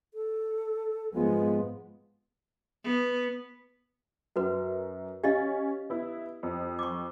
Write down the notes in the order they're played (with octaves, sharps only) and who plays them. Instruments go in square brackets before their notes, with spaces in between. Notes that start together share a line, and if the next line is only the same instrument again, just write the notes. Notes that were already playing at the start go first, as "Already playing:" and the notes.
[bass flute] A4
[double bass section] G#2 G#3 B3 [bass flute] F3
[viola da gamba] B3
[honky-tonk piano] F#2 [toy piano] F#4 B4
[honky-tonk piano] C#4 [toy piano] G4 D#5 F5
[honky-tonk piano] B3 E4
F2
[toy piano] C#6 D6